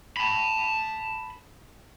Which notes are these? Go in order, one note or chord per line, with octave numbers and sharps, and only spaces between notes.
A5 B5